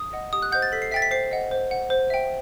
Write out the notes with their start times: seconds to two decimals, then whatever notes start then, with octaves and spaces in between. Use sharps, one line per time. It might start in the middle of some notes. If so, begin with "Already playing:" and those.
Already playing: D#6
0.13 D#5 F#5
0.33 G4 D#6
0.42 F#6
0.52 C5 D#5 F#5 G6
0.62 A6
0.72 A4 B6
0.82 C7
0.92 E5 G5 A6 B6
1.02 B6
1.11 C5 C7
1.31 D#5 F#5
1.51 C5
1.71 F#5
1.90 C5
2.10 E5 G5